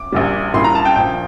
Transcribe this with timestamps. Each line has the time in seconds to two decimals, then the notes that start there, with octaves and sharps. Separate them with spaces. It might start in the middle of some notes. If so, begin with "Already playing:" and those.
Already playing: D6
0.12 A#1 A#2 G3
0.54 A#1 A#2 G3 A#3 E4 C6
0.64 A#5
0.75 A5
0.85 G5
0.96 A#1 A#2 F3 G5